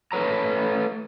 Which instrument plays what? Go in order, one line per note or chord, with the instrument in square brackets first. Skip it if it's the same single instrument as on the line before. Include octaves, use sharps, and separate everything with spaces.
[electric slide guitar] A3 B4 C#5 A#5